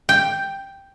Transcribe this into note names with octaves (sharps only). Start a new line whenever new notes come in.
G5